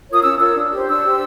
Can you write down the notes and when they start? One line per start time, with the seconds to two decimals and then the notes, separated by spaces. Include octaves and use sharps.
0.08 F4 A#4 C#5 D#6
0.24 C#4 E6
0.39 F4 A#4 C#5 E6
0.56 D4
0.71 G4 C5
0.87 D4 E6
1.03 G4 C5